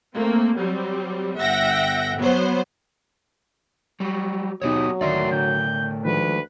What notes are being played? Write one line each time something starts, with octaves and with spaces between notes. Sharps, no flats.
A3 A#3 C4
F#3 G3 C4
G1 E5 F#5 G5 A#6
F#3 B3 C5
F#3 G3
D#2 B2 F#3 B3 D#4 G4 C#5 D#6
D2 A2 D#3 A#4 D5 E5 C6
D3 G6
D2 D#3 F3 G#3 B4